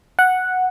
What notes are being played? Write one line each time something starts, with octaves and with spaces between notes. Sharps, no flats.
F#5